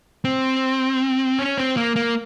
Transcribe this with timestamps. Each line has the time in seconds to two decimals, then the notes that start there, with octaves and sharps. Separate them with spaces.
0.24 C4
1.39 C#4
1.58 C4
1.77 A#3
1.96 A#3